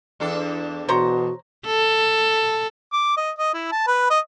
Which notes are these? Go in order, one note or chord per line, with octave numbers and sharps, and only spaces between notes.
E2 D4 A4
B2 F#4 C5 C#5 A#5
A4
D6
D#5
D#5
E4
A5
B4
D#5